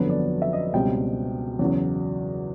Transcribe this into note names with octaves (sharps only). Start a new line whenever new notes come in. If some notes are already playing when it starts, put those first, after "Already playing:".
Already playing: G1 F2 D3 F#3 B3
D5
E5
D#5
C#2 B2 G3 C4 G5
E2 C#3 F#3